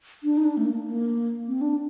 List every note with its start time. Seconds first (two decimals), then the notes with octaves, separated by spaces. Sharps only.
0.24 D4
0.37 D#4
0.44 D4
0.57 A3
0.65 A#3
0.86 A#3
1.48 C4
1.61 D4